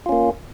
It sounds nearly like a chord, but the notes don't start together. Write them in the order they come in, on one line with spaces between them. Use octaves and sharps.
F4 C#4 A#3